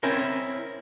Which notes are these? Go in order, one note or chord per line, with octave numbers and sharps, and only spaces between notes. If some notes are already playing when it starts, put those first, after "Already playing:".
C4 C#4 E4 A#4